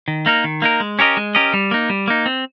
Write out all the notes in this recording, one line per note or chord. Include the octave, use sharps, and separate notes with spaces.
D#3
A#3 D#4 A#4
D#3
A#3 D#4 A#4
G#3
C#4 G4 A#4 D#5
G#3
C#4 G4 A#4 D#5
G3
A#3 D#4
G3
A#3 D#4
C4